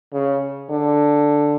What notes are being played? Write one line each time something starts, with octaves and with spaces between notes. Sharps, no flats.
C#3
D3